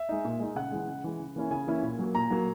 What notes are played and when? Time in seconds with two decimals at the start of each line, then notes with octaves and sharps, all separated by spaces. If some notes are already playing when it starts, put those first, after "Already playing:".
Already playing: E5
0.09 G#3 D#4
0.25 A#2
0.40 G#3 D#4
0.55 C#3 F#5
0.71 E3 G#3
0.87 C#3
1.04 E3 G#3
1.19 C#3
1.36 E3 A#3 C#4 E4
1.51 C#3 G#5
1.67 E3 A#3 C#4 E4
1.83 A#2
1.99 F#3 A#3
2.15 A#2 A#5
2.30 F#3 A#3